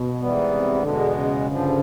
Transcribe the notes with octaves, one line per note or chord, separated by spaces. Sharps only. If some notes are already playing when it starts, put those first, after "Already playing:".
Already playing: B2
G#2 E3 G3 B3
C3
E2 B2 D3 G#3
C#3
G2 D3 F3